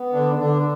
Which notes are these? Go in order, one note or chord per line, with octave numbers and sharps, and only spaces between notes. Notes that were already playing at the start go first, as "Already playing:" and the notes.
Already playing: B3
D3 D4
D3 D4